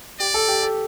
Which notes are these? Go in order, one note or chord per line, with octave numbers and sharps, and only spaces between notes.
G4 D5
A4
G4
A4